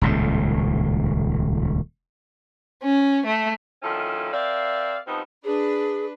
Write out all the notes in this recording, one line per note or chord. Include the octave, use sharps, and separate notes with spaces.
D#1 C#2 A2
C#4
A3
D2 D#3 F3 C#4 E4 A4
C4 A#4 D5 E5 F5
G2 F3 B3 C4 D#4
D4 G#4 B4